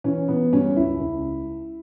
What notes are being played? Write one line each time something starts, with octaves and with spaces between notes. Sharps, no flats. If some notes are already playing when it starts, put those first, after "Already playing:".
E3 C#4
E3 B3
G2 C#4
C#2 E4
C#2